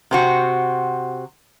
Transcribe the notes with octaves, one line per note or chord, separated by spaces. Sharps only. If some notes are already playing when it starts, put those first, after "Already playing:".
C3 C4 F#4